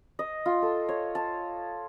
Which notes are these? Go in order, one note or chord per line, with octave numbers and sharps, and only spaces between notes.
D#5
F4
A4
C#5
A5